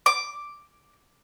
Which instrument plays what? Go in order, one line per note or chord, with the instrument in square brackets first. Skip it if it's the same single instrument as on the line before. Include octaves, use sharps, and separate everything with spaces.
[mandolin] D6